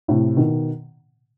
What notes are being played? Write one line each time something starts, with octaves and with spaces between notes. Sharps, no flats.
A2 C3
B2 D#3